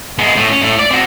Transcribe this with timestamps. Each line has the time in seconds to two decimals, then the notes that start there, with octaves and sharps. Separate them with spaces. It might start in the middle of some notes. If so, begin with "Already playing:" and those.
0.18 G#3 B3
0.36 A2
0.49 C#4
0.62 A2
0.79 D5
0.91 C4 F#4